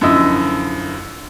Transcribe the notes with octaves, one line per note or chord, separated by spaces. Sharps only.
F#2 D3 F3 E4 D#5 E6